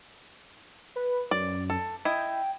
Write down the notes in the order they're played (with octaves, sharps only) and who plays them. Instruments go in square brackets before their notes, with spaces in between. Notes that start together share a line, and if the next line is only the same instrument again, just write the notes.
[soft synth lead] B4
[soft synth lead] F#2 [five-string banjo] D5
[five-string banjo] A4
[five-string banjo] E4 D#5 [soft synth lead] G5